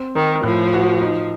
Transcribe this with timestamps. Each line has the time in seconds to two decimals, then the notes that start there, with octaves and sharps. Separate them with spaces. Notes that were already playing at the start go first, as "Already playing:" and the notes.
Already playing: C4
0.15 D#3 A#4
0.43 A2 F3
0.73 F#4
1.01 D#4